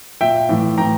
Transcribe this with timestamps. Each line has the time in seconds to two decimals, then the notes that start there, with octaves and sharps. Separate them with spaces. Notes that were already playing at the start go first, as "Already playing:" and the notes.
0.21 A#2 E5 G5
0.49 A2 E3
0.78 A2 E3 G5 A#5